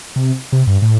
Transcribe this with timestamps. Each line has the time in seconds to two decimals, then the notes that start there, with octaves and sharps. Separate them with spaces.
0.16 C3
0.52 C3
0.67 G2
0.82 A2